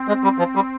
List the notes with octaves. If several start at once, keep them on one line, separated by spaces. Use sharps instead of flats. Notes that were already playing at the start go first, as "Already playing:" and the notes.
Already playing: C4
G#3
G3
F3
G3